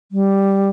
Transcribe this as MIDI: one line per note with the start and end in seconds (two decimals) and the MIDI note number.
0.12 0.70 55